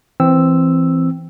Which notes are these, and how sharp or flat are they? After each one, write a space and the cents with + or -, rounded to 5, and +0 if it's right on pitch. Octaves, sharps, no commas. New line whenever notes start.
E3 +10 C4 +0 E6 +0